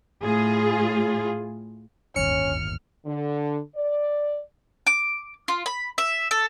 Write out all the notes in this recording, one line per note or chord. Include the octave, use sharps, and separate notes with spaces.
A2 F4 G#4
D1 G1 D#2 C#4 F6 C#7
D3
D5
D6
F4
B5
E5
A4